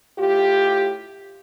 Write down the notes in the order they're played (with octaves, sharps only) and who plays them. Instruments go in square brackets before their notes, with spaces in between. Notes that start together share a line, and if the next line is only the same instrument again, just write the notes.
[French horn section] A2 F4 G4